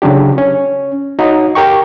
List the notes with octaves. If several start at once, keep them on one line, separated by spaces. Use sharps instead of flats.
C#3 F#3 D4 G4
C#4
D#4 F#4 C#5
G4 A#4 G5 C#6